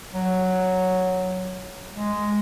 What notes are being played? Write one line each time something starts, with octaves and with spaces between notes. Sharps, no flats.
F#3
G#3